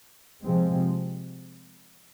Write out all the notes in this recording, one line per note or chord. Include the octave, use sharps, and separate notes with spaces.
C3 F3 G#3 C4